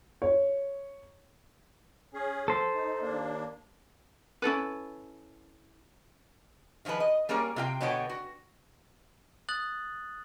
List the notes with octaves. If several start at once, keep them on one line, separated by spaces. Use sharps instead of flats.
C#5
C#4 G#4
F3 A4 C5
D#4
D#2 A#3 D4
C#4 E4 A4 B4
D#3 F3 D#4 G#4 B4
D#5
G3 A#3 C#4 G#4 A#4
C3 F4 G5
B2 D3 B3 C#5 G5
F#4
D#6 F#6 A6 F#7